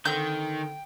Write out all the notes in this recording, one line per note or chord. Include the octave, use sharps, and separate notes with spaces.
D3 D#3 C4 G5 G6